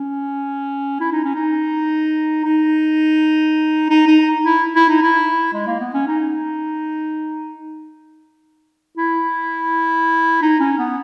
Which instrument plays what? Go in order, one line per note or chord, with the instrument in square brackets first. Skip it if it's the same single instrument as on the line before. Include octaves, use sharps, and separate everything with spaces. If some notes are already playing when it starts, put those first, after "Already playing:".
Already playing: [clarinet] C#4
E4
D#4
C#4
D#4
D#4
D#4
D#4
E4
E4
D#4
E4
G#3
A#3
B3
C#4
D#4
E4
D#4
C#4
B3